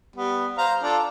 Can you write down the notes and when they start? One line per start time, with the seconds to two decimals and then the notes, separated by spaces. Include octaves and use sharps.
0.16 G3 B3
0.58 C5 F5 A#5
0.83 D4 F4 A4